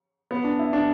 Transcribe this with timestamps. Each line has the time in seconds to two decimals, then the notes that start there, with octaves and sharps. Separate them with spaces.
0.31 B3
0.44 D4
0.59 E4
0.73 D4